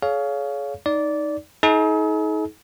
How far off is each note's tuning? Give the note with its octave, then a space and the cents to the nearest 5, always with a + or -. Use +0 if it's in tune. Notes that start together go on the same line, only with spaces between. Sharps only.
G#4 +35 C#5 +25 F5 +0
D#4 +0 D5 -15
D#4 +35 G#4 +45